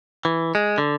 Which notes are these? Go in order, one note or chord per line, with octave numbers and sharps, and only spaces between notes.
E3
G#3
D3